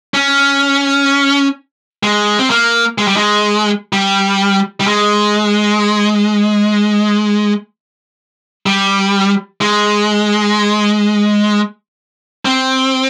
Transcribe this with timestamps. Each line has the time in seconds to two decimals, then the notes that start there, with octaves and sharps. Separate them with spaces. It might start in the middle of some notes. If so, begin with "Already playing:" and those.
0.14 C#4
2.03 G#3
2.39 C4
2.50 A#3
2.98 G#3
3.08 G3
3.16 G#3
3.93 G3
4.80 G3
4.87 G#3
8.66 G3
9.61 G#3
12.45 C4